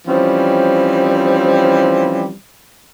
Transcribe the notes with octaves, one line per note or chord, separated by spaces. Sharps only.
E3 F3 G3 C4 C#4